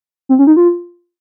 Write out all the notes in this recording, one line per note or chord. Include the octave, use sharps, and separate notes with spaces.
C4
C#4
D#4
F4